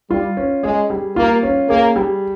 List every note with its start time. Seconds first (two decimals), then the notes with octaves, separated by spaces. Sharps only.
0.11 G3 F4
0.37 C#4
0.63 G#3 G#4
0.90 G3
1.16 A#3 F4
1.43 C#4
1.69 A#3 G#4
1.96 G3